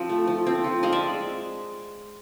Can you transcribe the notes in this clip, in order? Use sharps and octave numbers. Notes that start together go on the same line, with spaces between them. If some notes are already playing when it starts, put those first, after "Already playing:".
Already playing: F3 C4
A3
F3
C4
F3
G#3 D#5 F5
D5 E5